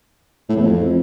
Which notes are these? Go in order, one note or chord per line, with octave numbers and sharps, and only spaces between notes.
A2
E2
F2